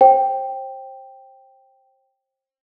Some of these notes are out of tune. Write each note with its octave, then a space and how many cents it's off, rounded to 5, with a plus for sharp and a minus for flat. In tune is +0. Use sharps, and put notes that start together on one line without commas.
C5 +30 G5 +0